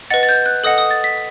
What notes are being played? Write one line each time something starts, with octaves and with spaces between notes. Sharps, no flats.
B4 D#5 F#5 A6
A6
G6
F#6
A4 D#5 F#5 D#6
D#6
A6
B6